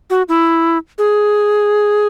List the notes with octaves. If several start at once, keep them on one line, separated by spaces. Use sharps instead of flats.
F#4
E4
G#4